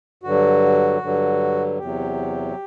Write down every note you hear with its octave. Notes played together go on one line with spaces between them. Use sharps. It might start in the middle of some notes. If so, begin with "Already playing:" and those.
G2 D3 F#3 F#4
G2 D3 F#3
E2 C3 F#3 G4